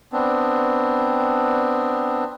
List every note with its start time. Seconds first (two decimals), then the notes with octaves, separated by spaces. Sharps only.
0.13 B3 C4 D4